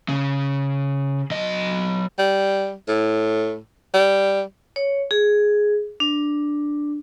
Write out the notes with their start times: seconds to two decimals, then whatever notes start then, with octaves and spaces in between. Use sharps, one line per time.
0.09 C#3
1.31 F#3 D#5
2.19 G3
2.88 A2
3.94 G3
4.76 C#5
5.11 G#4
6.00 D4